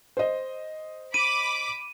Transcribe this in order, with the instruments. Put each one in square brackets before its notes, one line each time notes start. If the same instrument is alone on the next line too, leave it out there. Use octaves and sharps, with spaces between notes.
[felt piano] C5 D#5
[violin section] B5 D6 [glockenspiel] D#7